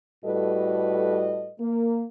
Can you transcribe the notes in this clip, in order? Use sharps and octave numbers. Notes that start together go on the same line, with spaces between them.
A2 G3 F#4 A4 B4 D#5
A#3